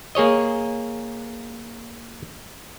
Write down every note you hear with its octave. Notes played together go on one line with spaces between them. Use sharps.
A#3 G#4 C#5 D#5